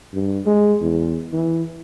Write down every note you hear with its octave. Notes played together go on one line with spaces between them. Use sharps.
G2
G#3
E2
E3